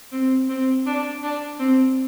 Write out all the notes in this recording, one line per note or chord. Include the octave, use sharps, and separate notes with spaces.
C4
C4
D4
D4
C4